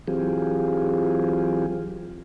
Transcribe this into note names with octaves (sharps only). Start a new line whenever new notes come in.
E3 F#3 C4 F4 G4 G#4